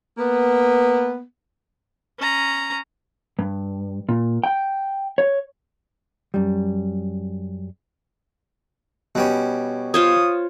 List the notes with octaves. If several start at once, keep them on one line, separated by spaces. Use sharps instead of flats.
A#3 B3
C#4 A#5
G2
A#2
G5
C#5
F#2 G3
B2 G3 C#4
F4 C5 C#5 D#6